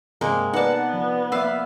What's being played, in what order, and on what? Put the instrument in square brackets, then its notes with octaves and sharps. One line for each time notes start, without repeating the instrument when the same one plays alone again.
[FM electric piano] G2 [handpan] C3 C4 [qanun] G#3 A#3
[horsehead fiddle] B3 [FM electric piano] D#4 B4 D5 [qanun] F#5 A5
[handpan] F3
[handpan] A#3 D5 E5 [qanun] B4 F5 [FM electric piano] B5 E6